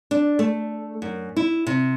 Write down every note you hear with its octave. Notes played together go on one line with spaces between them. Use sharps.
D4
A3
F#2
E4
C3